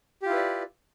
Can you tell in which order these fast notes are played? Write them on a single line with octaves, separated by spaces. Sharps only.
G4 F4 E4 B4 D5